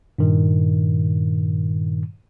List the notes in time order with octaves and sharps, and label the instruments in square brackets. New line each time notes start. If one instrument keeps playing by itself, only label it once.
[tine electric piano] G2 A#2 D#3